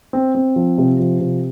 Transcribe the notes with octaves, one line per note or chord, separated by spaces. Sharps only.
C4
C4
F3
C3
F3
C3